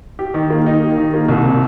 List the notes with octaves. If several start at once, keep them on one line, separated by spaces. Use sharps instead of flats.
G4
D#3
A#3
D#4
G4
D#3
A#3
C2
C3